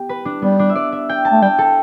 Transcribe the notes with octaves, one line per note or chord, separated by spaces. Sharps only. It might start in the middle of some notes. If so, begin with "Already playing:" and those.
Already playing: B3 G4
B4
D4
G3 B3
D4
E5
D5
E5
G5
A5
A3
G3 G5
A4